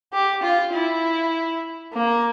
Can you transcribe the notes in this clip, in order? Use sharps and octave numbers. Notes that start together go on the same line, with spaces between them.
G4
F4
E4
A#3